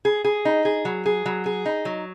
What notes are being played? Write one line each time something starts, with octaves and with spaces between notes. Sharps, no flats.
G#4
G#4
D#4
G#4
F#3
G#4
F#3
G#4
D#4
F#3